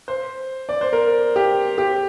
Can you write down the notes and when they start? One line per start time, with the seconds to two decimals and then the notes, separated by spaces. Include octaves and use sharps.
0.08 C5
0.69 D5
0.81 C5
0.93 A#4
1.36 G4
1.78 G4